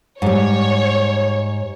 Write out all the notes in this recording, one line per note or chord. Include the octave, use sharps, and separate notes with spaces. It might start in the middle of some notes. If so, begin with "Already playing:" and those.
G#2 G3 C#5